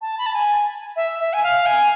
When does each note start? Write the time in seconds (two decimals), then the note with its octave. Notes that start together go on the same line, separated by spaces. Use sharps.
0.01 A5
0.18 B5
0.26 A5
0.34 G#5
0.96 E5
1.19 E5
1.33 G#5
1.43 F5
1.66 G#5